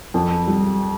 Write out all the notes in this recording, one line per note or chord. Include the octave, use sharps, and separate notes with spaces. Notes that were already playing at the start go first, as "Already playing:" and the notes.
F2
G3